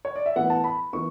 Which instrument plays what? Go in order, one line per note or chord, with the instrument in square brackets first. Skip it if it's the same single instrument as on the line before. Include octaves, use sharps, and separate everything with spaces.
[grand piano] C#5
D5
E5
A2 E3 B3 F#5
A5
B5
E3 B3 C#6